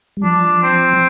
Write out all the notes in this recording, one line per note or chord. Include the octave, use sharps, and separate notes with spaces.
G3
F3 D4
C4